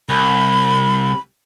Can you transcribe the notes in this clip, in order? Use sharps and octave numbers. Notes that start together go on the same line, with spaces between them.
C2 B5